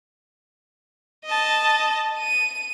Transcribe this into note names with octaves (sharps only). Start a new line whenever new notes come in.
D#5 A5
D#7